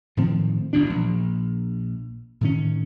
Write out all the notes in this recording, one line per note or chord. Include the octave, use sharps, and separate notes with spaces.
A2 D#3 F3 C4
G1 E2 B2 D4
A#1
A2 D#3 C#4